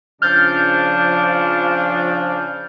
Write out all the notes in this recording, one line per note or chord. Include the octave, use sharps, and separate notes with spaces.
C#3 F3 D4 F6 G6 A6